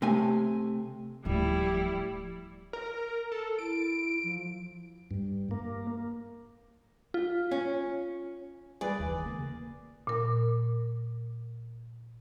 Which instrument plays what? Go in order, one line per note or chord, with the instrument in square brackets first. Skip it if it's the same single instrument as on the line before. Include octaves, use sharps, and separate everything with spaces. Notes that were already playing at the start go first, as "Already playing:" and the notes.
[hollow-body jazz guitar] C3 A3 G#5
[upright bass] D1 F3 [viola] G3 E4
[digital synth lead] A#4
A4
[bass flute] E4 [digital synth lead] D7
[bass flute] F3
[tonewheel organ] G2
A#3
[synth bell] F4
[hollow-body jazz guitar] C#4
[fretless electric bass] G3 [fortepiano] G#4 B4 [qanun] D5
[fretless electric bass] F1 D#2 E3
C#3 A#3
[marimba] A#2 A#4